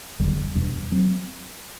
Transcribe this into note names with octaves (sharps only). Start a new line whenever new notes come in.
F#1 E2 D3 G3
E2 B2 G3 D4
F#3 C4